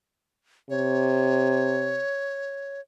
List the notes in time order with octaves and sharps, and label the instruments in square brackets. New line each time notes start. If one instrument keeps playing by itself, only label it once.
[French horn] C3 [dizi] C#5